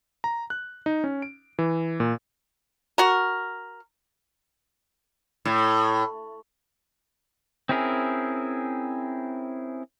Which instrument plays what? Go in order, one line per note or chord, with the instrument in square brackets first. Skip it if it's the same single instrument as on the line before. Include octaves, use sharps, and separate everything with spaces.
[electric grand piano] A#5
F#6
D#4
C#4
D7
E3
A#2
[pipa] F#4 A#4
[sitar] A2
[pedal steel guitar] C4 C#4 E4 G#4 A#4